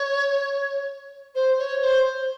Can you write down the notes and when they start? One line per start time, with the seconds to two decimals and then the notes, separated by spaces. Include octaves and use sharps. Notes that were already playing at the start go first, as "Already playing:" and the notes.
Already playing: C#5
1.35 C5
1.59 C#5
1.82 C5